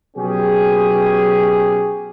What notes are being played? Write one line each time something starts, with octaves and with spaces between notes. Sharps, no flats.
B2 F#3 C#4 G4 G#4